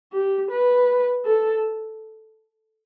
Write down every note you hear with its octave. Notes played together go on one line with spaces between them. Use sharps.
G4
B4
A4